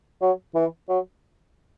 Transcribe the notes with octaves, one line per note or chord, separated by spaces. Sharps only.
F#3
E3
F#3